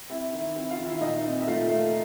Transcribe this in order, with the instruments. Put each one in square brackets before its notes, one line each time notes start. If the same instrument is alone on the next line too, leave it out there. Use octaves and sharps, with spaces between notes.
[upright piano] C4 E4 E5
D#3
C4 E4 E5
F4 F5
D#3
E4 E5
A#2 D#4 D#5
C4
E5
A3 F4 F5
A3